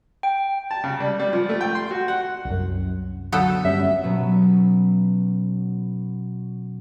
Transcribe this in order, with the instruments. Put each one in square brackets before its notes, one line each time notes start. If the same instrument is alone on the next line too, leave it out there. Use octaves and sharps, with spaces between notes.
[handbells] G5
[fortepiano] A5
C#3
G3
G3
F3
A3
G5
C6
F#4
F#5
[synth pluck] C2 F#2
[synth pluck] D3 F#3 [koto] B3 A4
[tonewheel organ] G2 G3 C#4 [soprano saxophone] E5
[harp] B2 F#3 B3 C#4